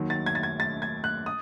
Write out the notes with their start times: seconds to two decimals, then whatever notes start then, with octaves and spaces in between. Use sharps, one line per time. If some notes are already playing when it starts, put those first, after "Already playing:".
Already playing: D#2 D#3 F#3
0.10 A6
0.26 G#6
0.35 A6
0.43 G#6
0.60 A6
0.82 G#6
1.04 F#6
1.26 D#6